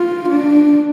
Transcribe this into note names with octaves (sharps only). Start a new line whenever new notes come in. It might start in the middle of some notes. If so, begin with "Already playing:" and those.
Already playing: F4
D4